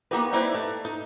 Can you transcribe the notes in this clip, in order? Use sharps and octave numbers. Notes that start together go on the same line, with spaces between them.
A#3 B3 D#4 F#4 G4 B4
G3 C4 D#4 E4 B4
A3
D#4